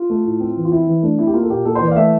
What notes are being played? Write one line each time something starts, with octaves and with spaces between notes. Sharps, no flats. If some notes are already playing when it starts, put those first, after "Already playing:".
Already playing: F4
A3
A2
C4
E3
F4
C4 E4
E3
A3 D4
C4 E4
G4
A#3 F4
A4
A#2 G4
A#3 A4
C5
E3
D5
F5
A3 E5